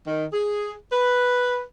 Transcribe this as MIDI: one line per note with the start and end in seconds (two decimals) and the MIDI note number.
0.07 0.26 51
0.33 0.73 68
0.92 1.63 71